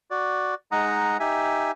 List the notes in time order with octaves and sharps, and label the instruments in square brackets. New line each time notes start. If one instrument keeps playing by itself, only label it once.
[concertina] F#4 D5
G#3 D#4 F#5 A#5 D#6
D#4 G4 E5 G#5